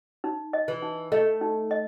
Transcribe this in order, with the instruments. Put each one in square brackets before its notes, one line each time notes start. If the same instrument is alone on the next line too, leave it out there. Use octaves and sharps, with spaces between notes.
[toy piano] D#4
D#5
[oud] E3
[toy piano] D#4
[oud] A3 [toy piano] D#5
[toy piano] D#4
D#5